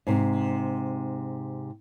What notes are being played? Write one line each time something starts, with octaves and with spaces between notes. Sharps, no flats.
G#2 C3